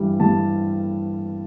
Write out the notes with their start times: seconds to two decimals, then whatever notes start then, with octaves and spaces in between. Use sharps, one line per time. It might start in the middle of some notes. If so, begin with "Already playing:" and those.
Already playing: G2 E3 G3
0.20 G2 E3 G3 A5